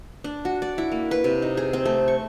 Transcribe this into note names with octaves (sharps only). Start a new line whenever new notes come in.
D4
F#4
D5
E4
A#3
B4
C3
D#4
G#4
C4
A3
C#6